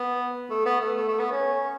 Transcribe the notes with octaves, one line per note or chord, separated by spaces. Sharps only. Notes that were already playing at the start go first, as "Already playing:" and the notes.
Already playing: B3
A3
B3
A3
A3
A3
B3
C#4